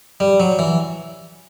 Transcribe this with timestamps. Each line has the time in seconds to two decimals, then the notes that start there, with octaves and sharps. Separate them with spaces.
0.20 G3
0.40 F#3
0.59 E3